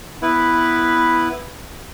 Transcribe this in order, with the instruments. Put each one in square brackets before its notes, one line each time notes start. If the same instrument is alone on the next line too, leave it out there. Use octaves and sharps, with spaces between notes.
[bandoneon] B3 E4 B4